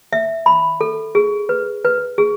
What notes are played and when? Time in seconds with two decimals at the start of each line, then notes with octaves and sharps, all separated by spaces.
0.13 E5
0.46 B5
0.81 A4
1.15 G#4
1.49 B4
1.85 B4
2.18 G#4